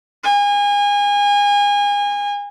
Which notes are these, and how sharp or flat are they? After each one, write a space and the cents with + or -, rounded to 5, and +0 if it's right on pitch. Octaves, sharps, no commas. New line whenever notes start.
G#5 -30